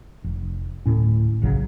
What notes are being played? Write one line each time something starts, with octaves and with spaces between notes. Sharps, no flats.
F1
D1 A2 C#4
F#1 B1 C#3 F#3